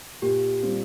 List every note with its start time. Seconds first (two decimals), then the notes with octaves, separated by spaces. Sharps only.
0.22 A#2 G4
0.62 G3 C4 F4